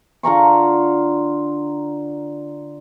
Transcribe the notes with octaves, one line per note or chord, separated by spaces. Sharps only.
D3 F4 A#5 C#6